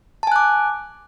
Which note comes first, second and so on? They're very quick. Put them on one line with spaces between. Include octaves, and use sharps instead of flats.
A5 G#5 F#6 D6